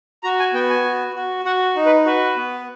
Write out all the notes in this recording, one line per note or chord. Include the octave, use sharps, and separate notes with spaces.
F#4 A#5
G#5
B3 G5
G#5
F#4
F#4
F#4 F#5
D#4
B4
F#4 B4
B3